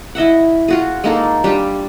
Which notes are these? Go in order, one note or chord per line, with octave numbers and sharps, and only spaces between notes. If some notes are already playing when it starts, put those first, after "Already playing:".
E4 D#5 E5 F#5
F4 F#4 G#4
G#3 A#3 D#4 A4
G3 D4 F4 G4